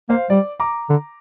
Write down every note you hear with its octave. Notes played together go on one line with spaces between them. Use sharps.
A#3 C5 F5
G3 D5
A#5 D6
D3